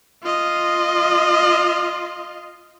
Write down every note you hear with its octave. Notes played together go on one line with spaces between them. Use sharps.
F4 D#5